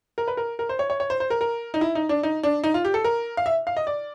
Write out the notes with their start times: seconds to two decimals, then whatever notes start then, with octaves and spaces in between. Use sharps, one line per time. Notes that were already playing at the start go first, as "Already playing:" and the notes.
0.18 A#4
0.28 B4
0.37 A#4
0.59 A#4
0.69 C5
0.79 C#5
0.90 C#5
1.00 C#5
1.10 C5
1.20 C5
1.30 A#4
1.41 A#4
1.74 D#4
1.81 E4
1.95 D#4
2.09 D4
2.23 D#4
2.43 D4
2.64 D#4
2.74 F4
2.85 G4
2.94 A4
3.04 A#4
3.37 F5
3.46 E5
3.67 F5
3.77 D#5
3.87 D5